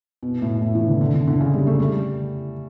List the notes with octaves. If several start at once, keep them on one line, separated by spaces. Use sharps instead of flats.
B2
A2
A2
E3
D3
D3
D3
D3
C#3
G3
A3
G3